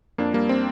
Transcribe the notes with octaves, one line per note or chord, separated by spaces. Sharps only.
F2 A#3 D4
G3 A#3
C4